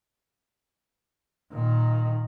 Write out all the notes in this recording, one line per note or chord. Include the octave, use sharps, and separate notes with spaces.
A#2 D#3